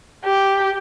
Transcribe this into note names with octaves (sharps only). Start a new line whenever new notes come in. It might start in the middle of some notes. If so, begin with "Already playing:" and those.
G4